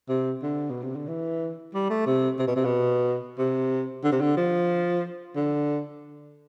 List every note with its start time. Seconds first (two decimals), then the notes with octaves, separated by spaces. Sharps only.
0.09 C3
0.42 D3
0.70 B2
0.83 C3
0.96 D3
1.08 E3
1.74 G3
1.90 A3
2.06 C3
2.39 C3
2.47 B2
2.56 C3
2.65 B2
3.39 C3
4.04 D3
4.12 C3
4.21 D3
4.37 F3
5.35 D3